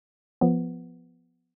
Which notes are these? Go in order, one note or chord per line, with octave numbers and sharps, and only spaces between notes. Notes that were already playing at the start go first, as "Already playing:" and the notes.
F3 B3